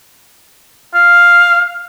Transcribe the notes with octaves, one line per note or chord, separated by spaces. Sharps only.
F5